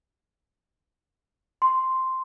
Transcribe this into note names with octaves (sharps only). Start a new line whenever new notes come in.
C6